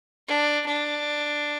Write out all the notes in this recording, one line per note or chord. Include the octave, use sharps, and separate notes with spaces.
D4
D4